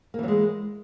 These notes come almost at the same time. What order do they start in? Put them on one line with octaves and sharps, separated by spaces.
A#3 E3 F#3 G#3